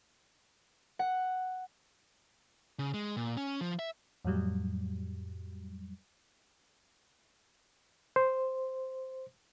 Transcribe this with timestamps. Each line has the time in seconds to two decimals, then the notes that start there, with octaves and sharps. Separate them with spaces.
0.99 F#5
2.79 C#3
2.94 G#3
3.17 A#2
3.37 C#4
3.61 F3
3.79 E5
4.25 F2 A2 F#3 G3
8.16 C5